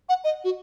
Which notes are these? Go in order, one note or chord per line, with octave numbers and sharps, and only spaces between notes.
F#5
D#5
F#4